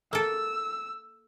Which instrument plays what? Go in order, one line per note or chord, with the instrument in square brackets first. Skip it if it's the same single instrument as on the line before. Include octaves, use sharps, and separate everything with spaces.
[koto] A#3 A4 [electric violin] E6